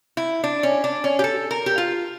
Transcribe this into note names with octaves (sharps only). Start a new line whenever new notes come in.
E4
D4
C#4
D4
C#4
G4
A4
A#4
G4
F4